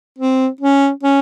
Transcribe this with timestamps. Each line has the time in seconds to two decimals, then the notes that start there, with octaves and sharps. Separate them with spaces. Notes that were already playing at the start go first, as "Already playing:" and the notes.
0.18 C4
0.61 C#4
1.03 C#4